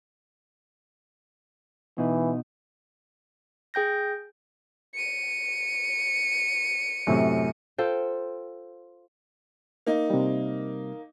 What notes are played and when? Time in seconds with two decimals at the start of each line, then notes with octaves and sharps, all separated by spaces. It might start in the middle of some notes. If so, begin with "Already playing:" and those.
1.98 B2 E3 D#4
3.74 G#4 G5 G6 A#6
4.94 C#7 D#7
7.07 F#2 A2 C3
7.78 F4 A4 C5 G5
9.87 A#3 D#4
10.10 C3 G3